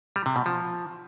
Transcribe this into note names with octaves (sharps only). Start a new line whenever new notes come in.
G3
C3
B2
F3